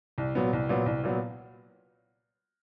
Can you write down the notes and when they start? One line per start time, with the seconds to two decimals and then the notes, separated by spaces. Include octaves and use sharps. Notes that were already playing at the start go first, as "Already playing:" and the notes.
0.18 C2
0.35 A#2 F#3 B3
0.53 C2
0.69 A#2 F#3 B3
0.86 C2
1.04 A#2 F#3 B3